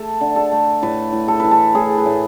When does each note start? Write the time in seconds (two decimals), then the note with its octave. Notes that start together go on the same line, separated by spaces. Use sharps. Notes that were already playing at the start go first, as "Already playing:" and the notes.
Already playing: A3 A4
0.21 D3
0.36 A4
0.51 A3
0.82 A2 B4
1.13 A2
1.28 A4
1.40 E3 B4
1.51 A4
1.75 A2 G#4
1.98 B4
2.06 A2